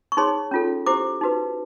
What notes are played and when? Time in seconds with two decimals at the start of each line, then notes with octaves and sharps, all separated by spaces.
0.12 C#6
0.17 D#4 G#4 C#5 C6
0.51 C#4 F4 A4
0.86 E4 G4 C5 D6
1.21 D#4 F#4 B4